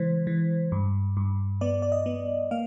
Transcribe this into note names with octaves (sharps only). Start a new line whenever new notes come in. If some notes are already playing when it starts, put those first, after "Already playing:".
Already playing: C#3 E3 G#3 C5
E3
G2
G2
B3 D5
D5
D#5
B3
A#3 F5